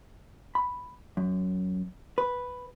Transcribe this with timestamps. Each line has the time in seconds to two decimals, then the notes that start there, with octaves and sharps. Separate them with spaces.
0.55 B5
1.17 F#2
2.18 B4